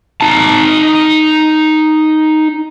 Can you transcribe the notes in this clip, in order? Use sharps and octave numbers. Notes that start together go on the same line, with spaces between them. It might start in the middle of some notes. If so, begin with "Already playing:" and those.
D#4 A5